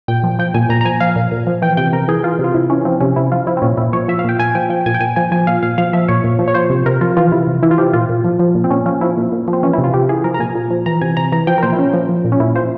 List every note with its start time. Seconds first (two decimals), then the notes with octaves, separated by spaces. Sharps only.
0.08 A#2 G5
0.23 F3
0.39 F3 G5
0.54 A#2 G#5
0.70 A#2 A#5
0.81 A#5
0.85 F3 G#5
1.00 F3 F5
1.16 A#2
1.32 A#2
1.47 F3
1.62 E3 G5
1.77 C3 G5
1.93 C3 A#4
2.08 E3 G#4
2.24 E3 F4
2.39 C3
2.44 F4
2.54 C3 E4
2.70 E3 C#4
2.85 F3 C4
3.00 C3 C#4
3.16 C3 E4
3.32 F3 F4
3.47 F3 E4
3.57 C4
3.62 A#2 C#4
3.77 A#2 E4
3.93 F3 C#5
4.08 F3 E5
4.19 F5
4.24 A#2 G5
4.39 A#2 G#5
4.55 F3 G5
4.70 F3 G5
4.86 A#2 G#5
4.94 G5
5.01 A#2 G#5
5.16 F3 G#5
5.32 F3 G#5
5.47 A#2 F5
5.63 A#2 F5
5.78 F3 F5
5.93 F3 E5
6.08 A#2 C#5
6.24 A#2
6.39 F3
6.48 C#5
6.54 F3 C5
6.70 C3
6.86 C3 A#4
7.01 F3 F4
7.17 E3 F4
7.32 C3 E4
7.47 C3
7.63 E3 E4
7.71 F4
7.78 F3 G4
7.93 A#2 F4
8.09 A#2
8.25 F3
8.39 F3
8.55 A#2
8.64 C4
8.70 A#2 C#4
8.86 F3 C#4
9.01 F3 E4
9.17 A#2
9.32 A#2
9.48 F3
9.53 C4
9.63 E3 C#4
9.73 C3 E4
9.84 F4
9.94 C3 G4
10.09 E3 G#4
10.24 F3 A#4
10.34 A#5
10.39 A#2 G#5
10.55 A#2
10.71 F3
10.86 E3 A#5
11.01 C3 G#5
11.17 C3 A#5
11.32 E3 A#5
11.47 F3 G5
11.58 A#4
11.63 A#2 C5
11.72 E4
11.79 A#2 C#4
11.94 F3
12.09 F3
12.25 A#2
12.32 C#4
12.40 A#2 E4
12.55 F3 C5